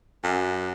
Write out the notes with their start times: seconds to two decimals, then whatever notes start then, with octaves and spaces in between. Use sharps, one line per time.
0.24 F#2